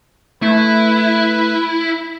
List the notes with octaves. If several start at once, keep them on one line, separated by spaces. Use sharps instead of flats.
A3 E4 B4